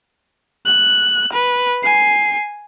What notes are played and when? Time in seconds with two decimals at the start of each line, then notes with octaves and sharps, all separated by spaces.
0.66 F#6
1.33 B4
1.83 G#5 C7